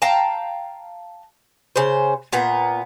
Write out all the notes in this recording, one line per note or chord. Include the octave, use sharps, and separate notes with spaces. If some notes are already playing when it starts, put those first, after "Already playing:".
F5 G5 A5 A#5
C#3 C5
A#2 B3 A#5